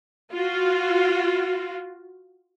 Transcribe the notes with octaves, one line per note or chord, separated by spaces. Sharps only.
F4 F#4